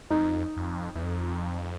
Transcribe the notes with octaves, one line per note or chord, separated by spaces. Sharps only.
F2 D#4
F2
E2
F2